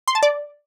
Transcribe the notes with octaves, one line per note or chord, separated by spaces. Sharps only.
C6
A5
D5